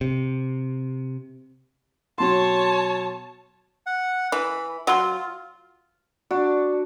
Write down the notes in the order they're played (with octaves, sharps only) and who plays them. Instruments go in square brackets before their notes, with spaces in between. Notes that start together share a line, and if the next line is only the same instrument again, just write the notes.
[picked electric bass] C3
[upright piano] B2 F#3 C6 [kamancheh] C#5 A5
[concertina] F#5
[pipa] E3 [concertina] B5
[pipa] F#3 C6 [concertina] F4
[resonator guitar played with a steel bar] D4 [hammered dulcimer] F#4